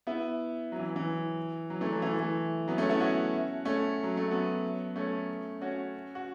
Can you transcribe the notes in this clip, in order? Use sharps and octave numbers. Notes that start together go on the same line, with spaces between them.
B3 E4
F#3
E3
E3
F#3
E3 A3
F#3
E3 A3
E3 A3
F#3 B3
A3 C#4
B3 E4
C#4 F#4
A3 C#4
F#3
A3
F#3 B3
A3 C#4
C#4 F#4
F#4